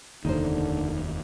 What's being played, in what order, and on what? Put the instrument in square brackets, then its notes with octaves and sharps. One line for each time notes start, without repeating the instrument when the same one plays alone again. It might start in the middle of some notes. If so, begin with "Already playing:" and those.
[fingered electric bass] F1 D#2 [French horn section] D3 [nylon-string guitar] D#4 A#4 C5